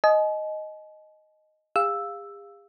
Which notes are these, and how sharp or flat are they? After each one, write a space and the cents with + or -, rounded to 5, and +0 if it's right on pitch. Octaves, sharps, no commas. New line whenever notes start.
D#5 +0 G#5 +45
G#4 -45 F5 +0 E6 +0